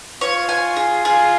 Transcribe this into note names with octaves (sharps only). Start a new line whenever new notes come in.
F4 C#5
G#5
G#4
F4 G#4